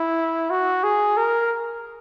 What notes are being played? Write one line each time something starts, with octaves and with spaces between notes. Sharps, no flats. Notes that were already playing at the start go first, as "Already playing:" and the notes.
Already playing: E4
F#4
G#4
A#4